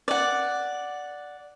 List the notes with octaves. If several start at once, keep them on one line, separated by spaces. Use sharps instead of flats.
D5 F#5